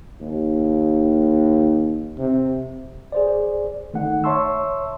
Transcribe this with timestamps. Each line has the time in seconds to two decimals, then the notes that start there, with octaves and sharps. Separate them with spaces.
0.21 D#2
2.18 C3
3.12 G#4 C5 D5
3.94 D#3 A3 D#4 F#5
4.24 C#5 E5 A5 C6 C#6 E6